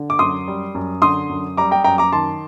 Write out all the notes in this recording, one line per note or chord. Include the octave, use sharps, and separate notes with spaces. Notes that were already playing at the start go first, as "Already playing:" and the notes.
Already playing: D3
D6
F#2 C6 D#6
G3
F#2
D3 C6 D#6
F#2
G3 A#5 D6
G5 A#5
F#2 G5 A#5
A#5 D6
D#3 A5 C6